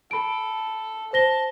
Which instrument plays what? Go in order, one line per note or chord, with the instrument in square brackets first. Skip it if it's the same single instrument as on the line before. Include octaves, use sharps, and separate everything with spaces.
[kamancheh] A4 [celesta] B5 D7
[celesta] C5 A#6 G7 [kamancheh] A5